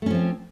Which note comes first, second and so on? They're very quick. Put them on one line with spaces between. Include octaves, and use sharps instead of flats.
A3 C#4 F3 C4